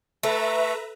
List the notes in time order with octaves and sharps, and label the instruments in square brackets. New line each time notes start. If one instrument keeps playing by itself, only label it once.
[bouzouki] A3 [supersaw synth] B4 E5 A#5